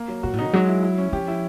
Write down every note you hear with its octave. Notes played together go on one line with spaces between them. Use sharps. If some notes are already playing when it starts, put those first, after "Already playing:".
Already playing: A#3
F#3
A#2 F#4
A2
D#3 D#4
F#3 G#3
E4
E4
C#4
F3 G4
E4